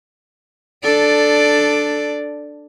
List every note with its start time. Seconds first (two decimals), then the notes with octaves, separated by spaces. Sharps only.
0.83 D4 A4 D5